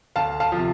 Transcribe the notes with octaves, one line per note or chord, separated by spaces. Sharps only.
D2 F5 A5
F5 A5
C3 F3